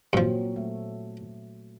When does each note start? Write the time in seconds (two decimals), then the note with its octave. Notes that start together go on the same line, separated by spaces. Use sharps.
0.13 G2 A#2 F3 F#3 C4
0.56 A3